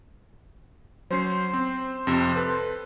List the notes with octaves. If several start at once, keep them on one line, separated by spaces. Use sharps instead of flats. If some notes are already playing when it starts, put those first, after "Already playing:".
F#3 C#4 C5 C7
C4
F2 C3 C5
A4 B4